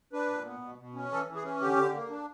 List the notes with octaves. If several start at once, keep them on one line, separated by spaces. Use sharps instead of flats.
D4 B4
A#2
B3
B2
B2
C#4
E3 A4
E3
G#4
C#4
D3 G4
D3
A#3
D4